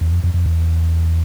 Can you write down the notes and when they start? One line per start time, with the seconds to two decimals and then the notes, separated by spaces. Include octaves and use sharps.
0.01 E2
0.12 F2
0.24 F2
0.34 F2
0.46 E2